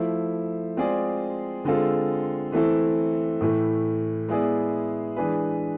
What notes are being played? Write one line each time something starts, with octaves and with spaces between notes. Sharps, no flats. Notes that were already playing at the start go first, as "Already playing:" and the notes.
Already playing: F3 A3 E4
G#3 C4 F4 G#4 D5
D3 G#3 C4 F4 A4
E3 A3 C4 E4 A4
A2 E3 A3
G#3 B3 E4 G#4 D5
E3 G#3 D4 G#4 B4